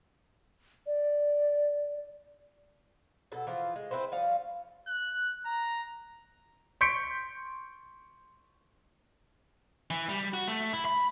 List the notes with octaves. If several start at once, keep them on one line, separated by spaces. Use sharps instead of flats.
D5
B2 F#3 A4
E3 F3 F4
G#3
C4 E4 B4 C5
F3 G3 C#4 F5
F#6
A#5
C6 C#6 G6 B6 C#7 D7
E3
G3
F#4
A3
E4
B5